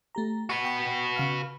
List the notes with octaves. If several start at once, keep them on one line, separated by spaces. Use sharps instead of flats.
A3 G4 A#5
F#4 B4 C#6
G5 C#6
C#3 F5 F6